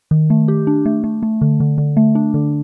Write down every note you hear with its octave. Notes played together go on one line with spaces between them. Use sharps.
D#3
A3
G4
D4
A3
A3
A3
D3
D3
D3
A3
D4
D3